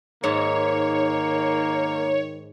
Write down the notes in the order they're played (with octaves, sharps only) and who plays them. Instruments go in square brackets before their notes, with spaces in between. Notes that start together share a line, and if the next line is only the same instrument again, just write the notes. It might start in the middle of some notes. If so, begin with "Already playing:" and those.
[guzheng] G#2 [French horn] D#3 [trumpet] A#3 [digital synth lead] C#5